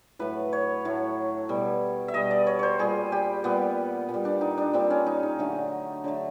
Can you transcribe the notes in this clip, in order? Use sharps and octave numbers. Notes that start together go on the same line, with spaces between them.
A2 F#3 A3 B4
C#5
A2 F#3 A3
B2 G3
E5
B2 G3 D#5
D5
C#5
C5 C#5
A#2 G3 G#4
G4
A#2 G3 B3
A#2
G3
D4
D#4
D4
A#2 G3 C4
C#4
D#4
D#4
D3 F#3 A3
D3 F#3 A3